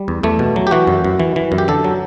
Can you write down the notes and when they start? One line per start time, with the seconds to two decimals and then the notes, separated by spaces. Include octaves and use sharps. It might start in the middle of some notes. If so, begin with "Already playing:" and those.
Already playing: G3
0.08 E2
0.23 E2 A3
0.39 B2
0.56 F#3
0.67 G4
0.71 E3 F#4
0.87 F#2
1.04 F#2
1.19 E3
1.36 E3
1.52 F#2
1.58 G4
1.68 D3 A4
1.84 F#3